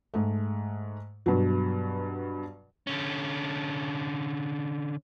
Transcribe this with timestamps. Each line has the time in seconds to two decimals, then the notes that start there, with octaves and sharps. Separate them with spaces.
0.14 G#2 A3
1.26 G2 B2 F#3
2.87 D3 C#4